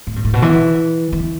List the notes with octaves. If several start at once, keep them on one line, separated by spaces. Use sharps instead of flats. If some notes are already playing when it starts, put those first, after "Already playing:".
A2
G2
A2
B2
E3
E3